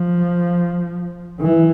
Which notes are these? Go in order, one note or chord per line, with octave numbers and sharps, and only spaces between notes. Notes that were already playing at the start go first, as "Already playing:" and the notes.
Already playing: F3
E3